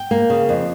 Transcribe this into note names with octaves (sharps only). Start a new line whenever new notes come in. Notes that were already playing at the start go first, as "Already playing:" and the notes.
Already playing: G5
A#3
C#3
F2